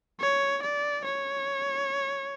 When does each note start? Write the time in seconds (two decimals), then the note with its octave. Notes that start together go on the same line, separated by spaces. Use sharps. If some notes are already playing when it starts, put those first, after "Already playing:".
0.20 C#5
0.62 D5
1.05 C#5